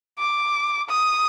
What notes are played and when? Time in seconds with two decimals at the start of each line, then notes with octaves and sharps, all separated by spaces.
0.19 D6
0.89 D#6